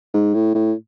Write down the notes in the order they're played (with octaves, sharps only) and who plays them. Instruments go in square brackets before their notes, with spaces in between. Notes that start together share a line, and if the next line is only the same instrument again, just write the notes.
[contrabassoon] G#2
A2
A2